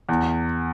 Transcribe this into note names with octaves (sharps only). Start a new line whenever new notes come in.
E2